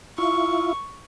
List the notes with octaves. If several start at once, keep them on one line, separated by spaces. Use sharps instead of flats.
E4 F4 C#6